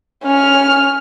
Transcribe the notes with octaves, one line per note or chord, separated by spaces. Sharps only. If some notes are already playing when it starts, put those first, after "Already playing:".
C#4 F6